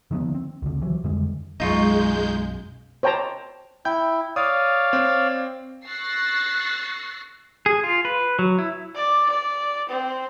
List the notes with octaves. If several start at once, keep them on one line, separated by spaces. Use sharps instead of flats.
D3 D#3 F3 B3
C4
C#2 D3
E3 F#3
F2 D3 G3 G#3
B1 F#2 G#3 D#4 F4 C#6 G6
C5 C#5 G5 A5 A#5
E4 G5 G6
C#5 D5 F5 D#6
C4
C#6 E6 F#6 A6 A#6 C7
G#4
F4
B4
F#3
E4
D5
D5
C4